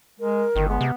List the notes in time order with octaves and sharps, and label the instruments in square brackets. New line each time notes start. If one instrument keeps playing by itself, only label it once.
[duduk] G#3 [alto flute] A#4
[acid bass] G1 [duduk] D#3
[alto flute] G#3 [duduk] B3
[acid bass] C3